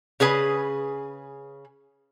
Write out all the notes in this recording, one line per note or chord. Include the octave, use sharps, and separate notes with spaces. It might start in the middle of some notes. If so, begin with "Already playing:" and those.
C#3 G#4 B4 G#5